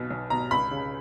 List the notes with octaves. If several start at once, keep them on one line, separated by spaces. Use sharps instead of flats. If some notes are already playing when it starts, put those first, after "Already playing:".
Already playing: B1 B2
B1
B2 A#5
C#2 B5
C#3